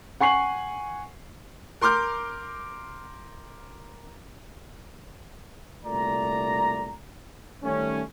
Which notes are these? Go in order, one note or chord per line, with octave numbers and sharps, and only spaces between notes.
F#5 G#5 C#6 C7 F#7
A#4 C6 D6 F6 G6
C2 A#2 A3 D5 A#5
D#3 G3 A3 C#4